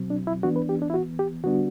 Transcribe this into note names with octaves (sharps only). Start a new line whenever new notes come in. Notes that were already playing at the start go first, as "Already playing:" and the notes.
Already playing: B2 F#3 C4
D4
E4
E3 B3 D4 F#4
B4
G4
D4
E4
F#4
G4
D3 G3 B3 D4 F#4